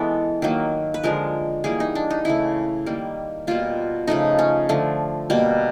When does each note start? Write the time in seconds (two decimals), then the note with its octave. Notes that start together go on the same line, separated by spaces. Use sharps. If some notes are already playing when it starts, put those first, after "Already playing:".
Already playing: E3 G#3 B3 A4
0.42 D#3 F#3 A#3
0.94 B4
1.03 D3 F3 G#3 A#4
1.64 E3 G3 A#3 G#4
1.80 D#4
1.95 D4
2.10 D#4
2.25 C#3 E3 A3 E4
2.86 D#3 G3 A#3
3.47 B2 G3 A#3 F4
4.07 C#3 F3 A3 D#4
4.39 C#4
4.69 D3 F3 A3
5.30 B2 G3 A#3